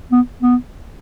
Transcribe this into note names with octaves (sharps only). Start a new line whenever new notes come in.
B3
B3